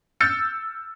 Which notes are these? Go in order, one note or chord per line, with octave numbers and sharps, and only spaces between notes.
E6 F6 G6 A6 C#7